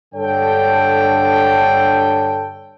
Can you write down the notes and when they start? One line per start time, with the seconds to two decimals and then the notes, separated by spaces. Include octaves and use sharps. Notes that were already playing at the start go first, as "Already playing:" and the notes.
0.15 G2 D3 A4 C#5 G5